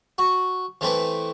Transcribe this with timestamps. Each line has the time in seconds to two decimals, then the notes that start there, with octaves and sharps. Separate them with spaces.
0.18 F#4
0.81 E3 A3 C4 B4